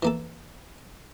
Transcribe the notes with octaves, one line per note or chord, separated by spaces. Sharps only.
E3 A#3 A4